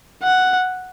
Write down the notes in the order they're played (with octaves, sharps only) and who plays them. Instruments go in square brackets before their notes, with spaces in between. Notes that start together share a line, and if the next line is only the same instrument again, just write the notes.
[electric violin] F#5